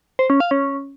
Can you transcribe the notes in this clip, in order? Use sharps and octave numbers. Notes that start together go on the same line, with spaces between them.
C5
C#4
F5
C#4